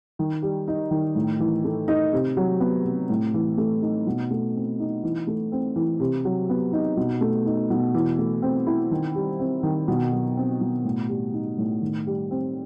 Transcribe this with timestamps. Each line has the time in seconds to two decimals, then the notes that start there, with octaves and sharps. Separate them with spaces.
0.19 D#3
0.42 G3
0.68 D#4
0.91 D#3
1.15 A2
1.40 E3
1.64 A3
1.88 D#4
2.12 C3
2.37 F#3
2.60 B3
2.85 C3
3.09 A2
3.34 E3
3.57 A3
3.82 D#4
4.07 B2
4.31 A3
4.55 C4
4.80 D#4
5.03 E3
5.27 A3
5.52 C4
5.76 E3
6.00 C3
6.25 F#3
6.49 B3
6.73 D#4
6.97 B2
7.21 A3
7.46 D#4
7.70 B2
7.94 E3
8.18 A3
8.42 C4
8.67 E4
8.91 D#3
9.15 G3
9.39 C4
9.63 D#3
9.88 B2
10.12 F#3
10.37 C4
10.61 B2
10.85 A2
11.09 G3
11.34 D#4
11.58 A2
11.82 D#3
12.07 G3
12.31 C4